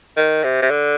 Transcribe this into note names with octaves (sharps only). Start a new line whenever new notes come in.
D#3
C3
C3
D3